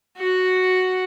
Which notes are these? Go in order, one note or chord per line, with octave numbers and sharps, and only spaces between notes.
F#4 F#5